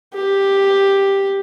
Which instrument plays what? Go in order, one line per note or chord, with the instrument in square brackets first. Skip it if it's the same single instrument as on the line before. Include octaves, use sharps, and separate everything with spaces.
[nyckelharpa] G4